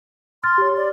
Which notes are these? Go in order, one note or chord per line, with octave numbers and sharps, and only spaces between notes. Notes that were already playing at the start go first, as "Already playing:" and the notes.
C6 F6 A6
G4 C#5
D5